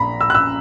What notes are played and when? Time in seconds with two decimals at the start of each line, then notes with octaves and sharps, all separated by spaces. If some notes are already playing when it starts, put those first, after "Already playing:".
Already playing: A#1 A#2 A#5 B5
0.21 E6
0.30 F#6
0.35 E6